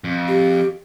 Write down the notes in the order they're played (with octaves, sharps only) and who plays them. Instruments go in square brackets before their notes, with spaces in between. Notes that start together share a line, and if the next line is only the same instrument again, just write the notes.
[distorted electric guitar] F2
[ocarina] G4